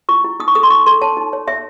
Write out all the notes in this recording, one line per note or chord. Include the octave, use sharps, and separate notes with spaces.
E4 C#6
E4
D#4 D#6
C#6
A4 D#6
C6
D#4 C#6
A4 C6
C#5 A5
D#4
C#5
C#5 E5